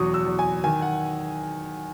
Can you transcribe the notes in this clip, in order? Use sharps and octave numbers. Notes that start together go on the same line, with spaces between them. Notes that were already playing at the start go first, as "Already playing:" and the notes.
Already playing: E2 B2 F#3 C#6 D#6
E6
E2
G#5
D#3 G#5
F#5